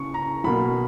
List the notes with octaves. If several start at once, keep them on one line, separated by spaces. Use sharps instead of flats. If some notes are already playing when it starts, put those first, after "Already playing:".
Already playing: C#3 C#6
A#5
B1 B2 A#3 B5